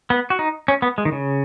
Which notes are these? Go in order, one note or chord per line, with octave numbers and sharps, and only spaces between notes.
B3
F#4
D#4
C#4
B3
G#3
D#3
C#3